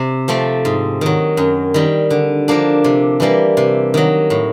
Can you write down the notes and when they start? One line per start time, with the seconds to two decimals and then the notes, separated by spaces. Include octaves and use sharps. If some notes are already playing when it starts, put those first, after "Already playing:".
Already playing: C3
0.28 F3 A3 C4
0.65 G#2
1.01 D#3 F#3
1.37 F#2
1.74 D#3 G3
2.10 D3
2.48 F3 A#3 D4
2.84 C3
3.20 E3 G3 A#3
3.57 C3
3.94 D#3 F#3
4.30 A2